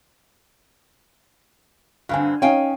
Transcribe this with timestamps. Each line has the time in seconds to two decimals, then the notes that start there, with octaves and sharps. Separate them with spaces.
2.09 G2 D3 C4 F5 G#5
2.42 C#4 D#4 F5 G5 G#5